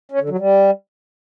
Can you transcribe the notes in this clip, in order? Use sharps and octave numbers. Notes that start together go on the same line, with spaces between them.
C#4
D3
F#3
G3